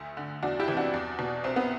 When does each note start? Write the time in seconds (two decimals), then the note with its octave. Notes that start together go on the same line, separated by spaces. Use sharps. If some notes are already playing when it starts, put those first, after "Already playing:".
Already playing: D2 A3
0.17 D3
0.43 E2 D4 F#4
0.60 E4 G4
0.68 C3 E3
0.77 D4 F#4
0.94 E2
1.19 B2
1.44 C2 C4
1.56 B3